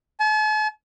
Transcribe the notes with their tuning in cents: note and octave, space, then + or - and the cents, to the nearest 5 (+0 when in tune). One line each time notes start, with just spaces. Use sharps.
A5 -45